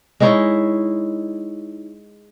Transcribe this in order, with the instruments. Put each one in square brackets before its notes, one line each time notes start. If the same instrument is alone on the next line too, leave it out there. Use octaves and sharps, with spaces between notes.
[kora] G#3 D#4 E4 C#5